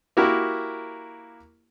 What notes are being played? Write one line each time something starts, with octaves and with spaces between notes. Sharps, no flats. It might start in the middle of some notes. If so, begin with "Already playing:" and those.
A#3 E4 F#4 G4 A#4